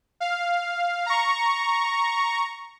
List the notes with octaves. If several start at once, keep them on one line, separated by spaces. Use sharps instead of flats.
F5
A#5 C#6